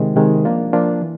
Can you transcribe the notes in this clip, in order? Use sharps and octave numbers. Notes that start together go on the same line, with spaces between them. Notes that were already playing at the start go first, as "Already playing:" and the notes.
Already playing: C3 D#3 G#3
C3 D#3 G#3
F3 A#3 D4 F4
F3 A#3 D4 F4
E3